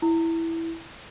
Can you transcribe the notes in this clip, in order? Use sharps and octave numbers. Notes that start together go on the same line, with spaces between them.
E4